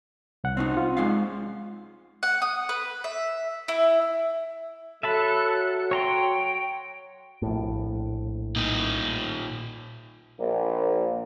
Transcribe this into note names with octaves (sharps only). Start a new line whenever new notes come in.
C2 F#5
C4 C#4 D#4
F4
G#3 D#4 F5
F#5
D#6
B4
E5
E4
F#3 A4 E5 A5 B5 F#6
C#5 G5 A#5 C6
A#1 A2
A#2 D#4
A#1 A#3